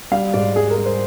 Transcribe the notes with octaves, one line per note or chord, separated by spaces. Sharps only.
G3 F5
G#2 D5
G3 G#4
A#4
G3
C5